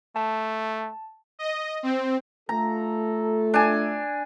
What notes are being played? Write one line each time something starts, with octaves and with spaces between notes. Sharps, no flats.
A3 A5
D#5
C4
A3 F4 A4 A#5
D4 G#5